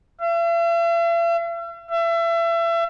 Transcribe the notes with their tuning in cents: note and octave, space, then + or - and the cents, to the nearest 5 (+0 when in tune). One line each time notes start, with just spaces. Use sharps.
E5 +45
E5 +30